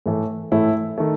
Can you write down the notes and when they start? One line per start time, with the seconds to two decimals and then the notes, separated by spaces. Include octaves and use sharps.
0.06 A2 E3 A3
0.52 A2 E3 A3 E4
0.98 D#3 A3